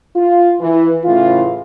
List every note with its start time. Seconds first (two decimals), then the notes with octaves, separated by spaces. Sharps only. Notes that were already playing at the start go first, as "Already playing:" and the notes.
0.16 F4
0.60 E3
1.05 A2 C#3 E3 E4 F4